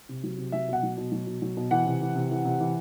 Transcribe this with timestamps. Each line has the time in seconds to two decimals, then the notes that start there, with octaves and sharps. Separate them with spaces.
0.09 C3
0.23 F#3
0.38 C3
0.52 F#3 E5
0.68 B2 F#5
0.83 F#3
0.97 B2
1.12 F#3
1.27 B2
1.42 F#3
1.57 B2
1.71 E3 F#5
1.86 C3
2.01 E3
2.16 C3
2.30 E3
2.45 C3
2.60 E3